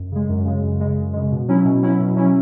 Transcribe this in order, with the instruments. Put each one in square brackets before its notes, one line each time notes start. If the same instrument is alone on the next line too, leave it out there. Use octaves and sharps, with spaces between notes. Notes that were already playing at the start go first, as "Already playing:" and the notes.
Already playing: [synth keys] F#2
C#3 G#3
F#2
C#3 G#3
F#2
C#3 G#3
F#2
C#3 G#3
B2
F#3 C#4 E4
B2
F#3 C#4 E4
B2
F#3 C#4 E4